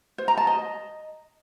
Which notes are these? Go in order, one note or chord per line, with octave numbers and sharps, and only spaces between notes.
C5
A#5
A5
D#5